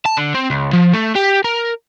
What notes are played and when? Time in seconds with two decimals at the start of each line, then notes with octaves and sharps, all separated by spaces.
0.06 A5
0.17 D3
0.35 C4
0.50 C#2
0.73 F3
0.93 A3
1.15 G4
1.44 A#4